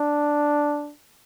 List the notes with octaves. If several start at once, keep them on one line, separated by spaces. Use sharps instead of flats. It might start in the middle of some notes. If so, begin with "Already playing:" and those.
Already playing: D4